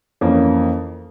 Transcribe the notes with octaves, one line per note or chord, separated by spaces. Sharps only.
F2 E3 A#3 C#4